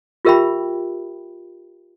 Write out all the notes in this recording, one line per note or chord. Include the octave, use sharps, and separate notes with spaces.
F4 G4 A#4 E5 G5 B5